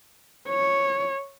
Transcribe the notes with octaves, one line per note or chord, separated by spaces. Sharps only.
C#5